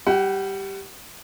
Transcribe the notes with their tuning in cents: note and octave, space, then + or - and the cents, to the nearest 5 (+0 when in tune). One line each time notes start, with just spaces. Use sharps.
G3 +0 F#5 +30